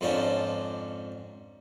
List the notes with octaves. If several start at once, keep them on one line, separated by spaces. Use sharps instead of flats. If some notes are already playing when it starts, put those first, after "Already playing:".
F2 G#2 F3 C#4 D4